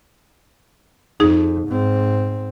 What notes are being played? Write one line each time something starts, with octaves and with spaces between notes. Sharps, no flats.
F2 D#4 G#4
G#2 C4